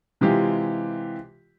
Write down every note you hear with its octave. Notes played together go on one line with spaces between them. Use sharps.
C3 E3 G#3 F4 G4